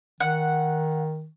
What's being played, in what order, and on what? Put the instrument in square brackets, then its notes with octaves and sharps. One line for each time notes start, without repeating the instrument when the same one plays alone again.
[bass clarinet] D#3 [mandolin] F#5